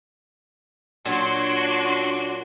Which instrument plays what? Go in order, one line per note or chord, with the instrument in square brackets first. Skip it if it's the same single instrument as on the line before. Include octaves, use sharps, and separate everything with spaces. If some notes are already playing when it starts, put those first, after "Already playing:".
[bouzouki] A#2 F#3 [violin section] D4 F#4 C6